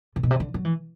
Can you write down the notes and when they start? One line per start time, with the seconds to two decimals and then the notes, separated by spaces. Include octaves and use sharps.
0.16 C3
0.23 B2
0.31 C3
0.40 D3
0.54 F#3
0.65 E3